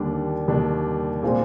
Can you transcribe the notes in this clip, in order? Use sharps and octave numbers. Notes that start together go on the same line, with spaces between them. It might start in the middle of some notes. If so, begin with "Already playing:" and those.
Already playing: D#2 D3 G3 D4
D#2 D3 G3 D4
A#2 G#3 C4 F4